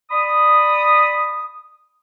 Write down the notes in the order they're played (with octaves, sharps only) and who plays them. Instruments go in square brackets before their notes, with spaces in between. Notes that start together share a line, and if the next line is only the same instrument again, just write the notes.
[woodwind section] D5 B5 D#6